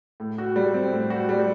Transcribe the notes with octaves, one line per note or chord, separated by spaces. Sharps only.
A2
F#4
G3
C4
A2
F#4
G3